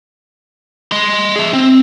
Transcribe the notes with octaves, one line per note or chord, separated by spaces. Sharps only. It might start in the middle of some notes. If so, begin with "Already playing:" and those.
D#5 C6
G#4 E5
C4